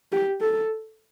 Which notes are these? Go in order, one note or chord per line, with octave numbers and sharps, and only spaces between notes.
G4
A4